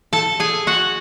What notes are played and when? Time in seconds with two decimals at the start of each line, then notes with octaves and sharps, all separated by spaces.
0.13 A4 A5
0.40 G#4 G#5
0.67 F#4 F#5